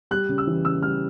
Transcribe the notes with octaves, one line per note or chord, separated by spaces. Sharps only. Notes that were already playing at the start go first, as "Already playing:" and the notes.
G3 F#6
C#3
E6
E3
C#3 E6
G3 F6